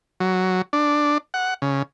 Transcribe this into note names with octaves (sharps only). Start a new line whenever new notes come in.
F#3
D4
F#5
C#3